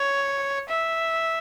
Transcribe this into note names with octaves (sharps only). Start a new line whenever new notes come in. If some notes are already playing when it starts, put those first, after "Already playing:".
Already playing: C#5
E5